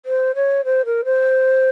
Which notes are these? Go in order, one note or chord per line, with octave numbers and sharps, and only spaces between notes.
C5
C#5
C5
A#4
C5